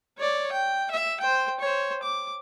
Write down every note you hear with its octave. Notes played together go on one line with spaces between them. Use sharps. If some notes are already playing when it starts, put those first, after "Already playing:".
C#5 D5
G5
E5
C5 G5
C5 C#5
D6